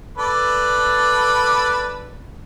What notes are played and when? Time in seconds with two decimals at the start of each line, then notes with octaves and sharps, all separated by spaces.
0.18 A4 B4 D5